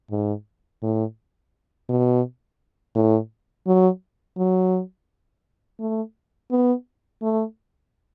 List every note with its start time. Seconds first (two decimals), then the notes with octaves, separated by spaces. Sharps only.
0.11 G#2
0.82 A2
1.89 B2
2.95 A2
3.67 F#3
4.37 F#3
5.80 A3
6.51 B3
7.22 A3